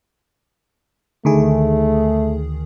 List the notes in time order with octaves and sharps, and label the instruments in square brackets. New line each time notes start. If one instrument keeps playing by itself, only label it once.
[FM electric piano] D2 D#3 G#4 [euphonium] A3